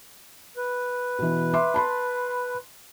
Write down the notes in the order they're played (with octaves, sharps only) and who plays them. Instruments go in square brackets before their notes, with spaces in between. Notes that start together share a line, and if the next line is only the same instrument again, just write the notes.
[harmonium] B4
[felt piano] B2 E3
E5 C6 D6
A5 B5 C6